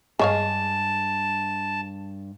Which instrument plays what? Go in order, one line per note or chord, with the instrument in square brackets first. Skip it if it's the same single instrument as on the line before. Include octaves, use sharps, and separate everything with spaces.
[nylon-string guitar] G2 G#4 [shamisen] G#3 C#5 F5 [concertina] A5